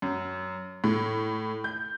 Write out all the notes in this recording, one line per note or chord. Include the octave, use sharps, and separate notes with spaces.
F#2
A2
G6